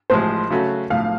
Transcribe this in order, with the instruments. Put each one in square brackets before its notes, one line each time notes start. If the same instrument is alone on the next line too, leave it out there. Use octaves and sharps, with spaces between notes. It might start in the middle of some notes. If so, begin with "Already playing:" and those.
[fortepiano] A1 A2 F3 G#3 [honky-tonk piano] C5
[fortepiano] C#3 F#3 A3 C#4 F#4
[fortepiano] B1 A2 F3 [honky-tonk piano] F5